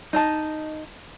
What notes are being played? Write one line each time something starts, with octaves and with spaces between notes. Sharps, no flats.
D#4 D#5 A5